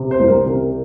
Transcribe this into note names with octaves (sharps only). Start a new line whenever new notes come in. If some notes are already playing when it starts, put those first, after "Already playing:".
Already playing: C3
C5
C2
A#4
C3